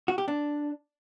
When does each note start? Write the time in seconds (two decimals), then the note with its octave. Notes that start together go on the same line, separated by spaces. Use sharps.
0.08 F#4
0.18 G4
0.28 D4